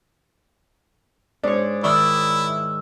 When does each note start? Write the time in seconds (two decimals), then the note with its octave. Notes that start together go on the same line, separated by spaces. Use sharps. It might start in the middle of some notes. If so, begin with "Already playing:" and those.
1.43 G#2 D4 C#5
1.84 D#3 E4 D5 C#6 E6 F6